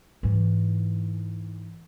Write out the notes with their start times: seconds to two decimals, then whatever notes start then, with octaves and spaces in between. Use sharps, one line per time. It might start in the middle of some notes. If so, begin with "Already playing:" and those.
0.23 G#2 E3